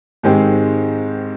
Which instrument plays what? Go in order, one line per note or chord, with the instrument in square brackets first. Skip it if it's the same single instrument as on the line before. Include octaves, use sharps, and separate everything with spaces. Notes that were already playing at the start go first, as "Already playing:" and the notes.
[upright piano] G#2 D#3 G#3 C4 G4